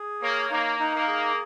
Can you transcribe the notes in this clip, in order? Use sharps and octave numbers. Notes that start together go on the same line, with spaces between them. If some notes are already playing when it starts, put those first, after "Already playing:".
Already playing: G#4
A#3 C#5
A#3 D#4
D#4
A#3
G#4